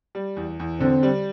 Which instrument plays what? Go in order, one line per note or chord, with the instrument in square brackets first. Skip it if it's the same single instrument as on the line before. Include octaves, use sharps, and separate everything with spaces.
[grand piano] G3
E2
E2
[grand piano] D3 [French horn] C4
[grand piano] G3